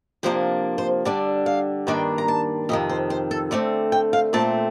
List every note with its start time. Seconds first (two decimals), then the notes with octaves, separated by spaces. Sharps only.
0.23 C3 F3 A#3 D4 C5
0.78 C5
1.05 D3 G3 D4 D5
1.46 F5
1.87 G2 D#3 A#3 D4 G5
2.18 A#5
2.28 A5
2.69 F2 C3 D#3 D#5
2.89 C5
3.10 C5
3.31 A4
3.51 D3 A3 C4 D5
3.92 G5
4.13 F5
4.33 A#2 A3 C4 A5